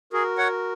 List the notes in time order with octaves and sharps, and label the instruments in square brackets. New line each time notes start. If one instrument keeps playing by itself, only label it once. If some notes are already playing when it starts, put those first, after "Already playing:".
[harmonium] F#4 A#4 [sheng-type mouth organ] G#4
[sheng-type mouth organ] C#5 F#5